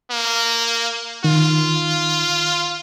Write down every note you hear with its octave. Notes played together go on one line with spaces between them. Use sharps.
A#3
D#3 F4